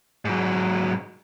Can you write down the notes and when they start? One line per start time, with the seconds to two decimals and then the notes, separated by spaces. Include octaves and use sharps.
0.25 G#2 F#3